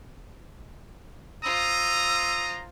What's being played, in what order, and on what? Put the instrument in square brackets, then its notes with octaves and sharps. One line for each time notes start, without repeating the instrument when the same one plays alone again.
[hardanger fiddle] F4 C5 [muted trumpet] A#5 [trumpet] D#6 [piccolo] E6